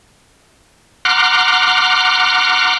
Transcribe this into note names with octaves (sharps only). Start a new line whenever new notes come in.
F#5 A#5 C6 D6 F6 F#6